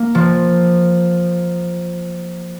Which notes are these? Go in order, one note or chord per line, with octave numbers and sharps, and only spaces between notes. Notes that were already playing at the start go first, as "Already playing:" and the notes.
Already playing: A#3
F3